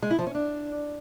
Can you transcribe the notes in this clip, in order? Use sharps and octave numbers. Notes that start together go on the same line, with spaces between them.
G#3
E4
F3
C#4
D4